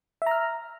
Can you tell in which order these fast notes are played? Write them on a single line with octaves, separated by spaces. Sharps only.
E5 A#5 F6